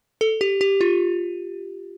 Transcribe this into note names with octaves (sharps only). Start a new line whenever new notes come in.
A4
G4
G4
F4